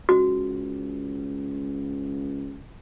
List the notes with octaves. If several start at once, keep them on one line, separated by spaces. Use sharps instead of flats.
C#2 F#4